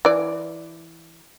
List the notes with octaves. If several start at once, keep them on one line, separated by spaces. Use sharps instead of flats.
E3 D5